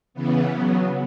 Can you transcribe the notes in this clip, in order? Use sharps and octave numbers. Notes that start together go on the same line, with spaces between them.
C#3 E3 B3
C#3 F#3 B3